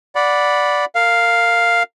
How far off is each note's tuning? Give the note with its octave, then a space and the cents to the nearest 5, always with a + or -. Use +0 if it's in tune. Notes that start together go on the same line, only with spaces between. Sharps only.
D5 -5 F#5 -15 B5 +0
A#4 -25 F5 +0